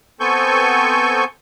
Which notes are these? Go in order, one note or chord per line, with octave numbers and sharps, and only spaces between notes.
B3 C4 A4 G#5 C#6 G6